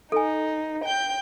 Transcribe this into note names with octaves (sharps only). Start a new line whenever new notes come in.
D#4 A4 G#5
G5 G6